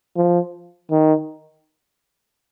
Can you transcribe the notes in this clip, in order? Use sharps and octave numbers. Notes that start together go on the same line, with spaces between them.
F3
D#3